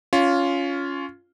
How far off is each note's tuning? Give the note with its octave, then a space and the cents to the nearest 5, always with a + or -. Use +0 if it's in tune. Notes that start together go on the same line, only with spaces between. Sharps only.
C#4 +15 F4 +0